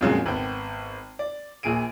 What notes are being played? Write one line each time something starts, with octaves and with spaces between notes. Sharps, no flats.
F2 A#2 C#3 F#3 G#3 A#3
G#1 B3 G5
D5
A#1 A#2 G#4 D7 D#7